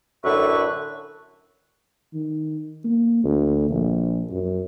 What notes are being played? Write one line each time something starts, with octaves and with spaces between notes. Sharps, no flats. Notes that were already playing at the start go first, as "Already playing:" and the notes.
F#2 A2 D3 B4 E5 C#6
D#3
A#3
D2
A#1
F#2